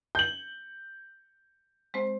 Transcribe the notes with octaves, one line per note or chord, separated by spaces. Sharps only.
G6 F#7
G#3 C4 C5